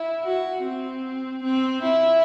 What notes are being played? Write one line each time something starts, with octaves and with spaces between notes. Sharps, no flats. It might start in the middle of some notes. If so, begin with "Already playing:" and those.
Already playing: E4
F#4
C4
C4
E4